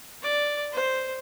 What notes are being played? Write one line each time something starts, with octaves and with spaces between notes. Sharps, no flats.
D5
C5